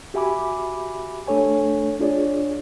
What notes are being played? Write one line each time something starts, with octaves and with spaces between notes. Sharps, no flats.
F#4 G4 E5 G#5 B5 D6
A3 D4 A4 C#5 G#5
D4 F4 G#4 C#5 D5